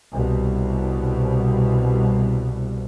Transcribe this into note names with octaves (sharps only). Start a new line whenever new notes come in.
C2 B2